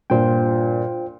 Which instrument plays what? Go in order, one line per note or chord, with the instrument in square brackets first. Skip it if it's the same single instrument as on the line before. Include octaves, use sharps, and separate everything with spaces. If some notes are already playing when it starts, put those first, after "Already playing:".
[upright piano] G2 A#2 [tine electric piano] F4 C5 G5